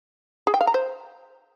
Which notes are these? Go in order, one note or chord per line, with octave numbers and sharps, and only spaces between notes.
G#4
G5
F5
A#5
C5